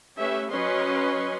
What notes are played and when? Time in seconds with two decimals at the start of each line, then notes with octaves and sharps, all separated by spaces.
0.19 A3 C#4 G4 B4 E5
0.51 F#3 C#4 B4 D#5 C6